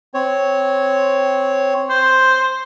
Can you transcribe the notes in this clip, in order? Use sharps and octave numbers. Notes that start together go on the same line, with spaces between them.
C4 C#5
C5